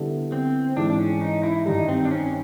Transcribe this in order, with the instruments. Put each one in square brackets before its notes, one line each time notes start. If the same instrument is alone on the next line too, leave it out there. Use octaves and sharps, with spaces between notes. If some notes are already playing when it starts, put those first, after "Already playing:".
Already playing: [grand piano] D3 G3 B3 E4 A4
[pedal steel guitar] C4
[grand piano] G#2 E3 G#3 [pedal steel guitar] D4
[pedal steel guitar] D4
C#4
D#4
E4
[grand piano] G2 D#3 G3 [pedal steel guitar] D#4
[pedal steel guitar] C4
D4
C#4